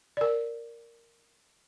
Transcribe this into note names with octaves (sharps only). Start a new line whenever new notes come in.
A#4 D5